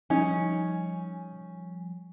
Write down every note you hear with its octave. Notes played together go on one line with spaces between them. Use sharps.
F3 G3 C#4 D#4 G#5